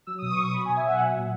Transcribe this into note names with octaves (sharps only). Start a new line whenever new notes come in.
F#3 E6
D#6
B2
C#6
F#3 D#6
F#3 B5
G#5
B2
E5
F#3 F#5
F#3 E5
A#2